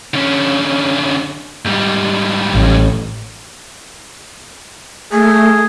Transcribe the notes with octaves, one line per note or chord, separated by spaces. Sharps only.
D3 C#4
G#2 G3
A1
A3 G#4